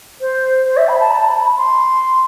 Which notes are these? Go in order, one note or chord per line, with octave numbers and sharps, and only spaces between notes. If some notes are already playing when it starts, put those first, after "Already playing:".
C5
C5
E5
B5
A5
B5
A5
B5
C6